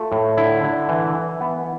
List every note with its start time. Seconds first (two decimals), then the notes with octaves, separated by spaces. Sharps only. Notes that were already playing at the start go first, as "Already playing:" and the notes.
Already playing: A3 F4
0.12 A2
0.37 D3 E4
0.64 D3
0.89 E3
1.15 E3
1.41 B3